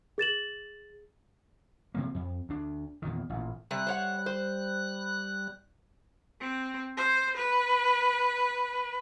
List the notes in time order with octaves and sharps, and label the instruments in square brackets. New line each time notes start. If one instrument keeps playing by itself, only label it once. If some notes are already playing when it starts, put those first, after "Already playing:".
[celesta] G#4 A6 E7 F#7
[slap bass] C3 F3 A#3
F2
D2 D4
E2 A#2 D#3
A1 A#2
[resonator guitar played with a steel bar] C3 [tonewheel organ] G3 F#6
[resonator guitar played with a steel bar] C5 C#5 F#5
C5
[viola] C4
C5
B4